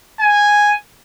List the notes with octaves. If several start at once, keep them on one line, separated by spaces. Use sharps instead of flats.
G#5